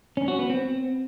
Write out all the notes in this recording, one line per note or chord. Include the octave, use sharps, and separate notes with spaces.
C#4
F#4
B3
C4